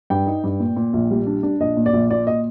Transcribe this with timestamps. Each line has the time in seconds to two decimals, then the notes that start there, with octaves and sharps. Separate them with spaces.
0.10 G2 G5
0.26 D#4
0.44 G2
0.60 A#2
0.76 A#2
0.93 A#1
1.11 G3
1.26 D4
1.43 D4
1.60 A#1 D#5
1.77 A#2
1.86 D5
1.93 A#1
2.10 A#2 D5
2.27 D#5